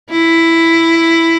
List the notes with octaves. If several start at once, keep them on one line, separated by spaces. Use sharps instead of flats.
E4